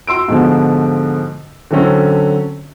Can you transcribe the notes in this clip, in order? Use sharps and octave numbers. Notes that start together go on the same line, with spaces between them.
F#4 C6 E6 D7
G#2 B2 D3 F3
D3 F#3 C4 C#4 A4